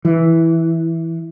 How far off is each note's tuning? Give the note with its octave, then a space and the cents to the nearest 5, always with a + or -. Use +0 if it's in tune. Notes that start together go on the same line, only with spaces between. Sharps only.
E3 -5